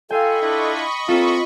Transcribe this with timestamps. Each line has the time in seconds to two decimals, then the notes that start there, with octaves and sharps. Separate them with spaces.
0.11 F4 A4 D#5 F5 G5 G#5 B5 C#6
0.41 D4 E4 F4
1.08 A#3 C4 F4 A4